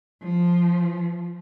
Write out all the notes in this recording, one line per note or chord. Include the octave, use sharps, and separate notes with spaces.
F3